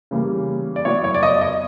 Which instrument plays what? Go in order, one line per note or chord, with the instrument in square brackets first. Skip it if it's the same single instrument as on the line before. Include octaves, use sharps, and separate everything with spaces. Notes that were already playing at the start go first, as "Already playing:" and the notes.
[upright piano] C#3 E3 G3 A#3
D5
F#3 B3 E4 C#5
C#5
D5
D#5
D#5